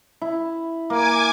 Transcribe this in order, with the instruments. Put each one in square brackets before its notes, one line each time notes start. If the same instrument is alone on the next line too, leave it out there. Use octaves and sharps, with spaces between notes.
[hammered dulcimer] E4
[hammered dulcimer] A#3 [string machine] G#5 D6 G#6